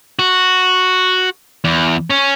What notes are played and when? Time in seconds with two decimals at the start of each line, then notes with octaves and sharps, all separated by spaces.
0.19 F#4
1.64 E2
2.10 C#4